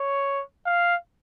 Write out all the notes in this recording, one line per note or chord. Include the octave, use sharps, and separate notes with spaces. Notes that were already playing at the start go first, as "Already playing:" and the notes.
Already playing: C#5
F5